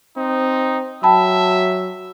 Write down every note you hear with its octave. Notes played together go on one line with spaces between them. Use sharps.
C4 D#4
F#3 E5 G5 A5 B5